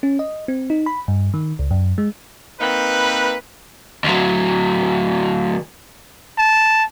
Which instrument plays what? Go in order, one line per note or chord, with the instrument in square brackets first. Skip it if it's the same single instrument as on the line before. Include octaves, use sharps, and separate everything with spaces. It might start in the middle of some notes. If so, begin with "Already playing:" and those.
[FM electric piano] C#4
D#5
C4
D#4
B5
G2
D#3
C#2
F#2
G#3
[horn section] A#3 C4 D#4 B4
[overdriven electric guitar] D2 F#3
[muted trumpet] A5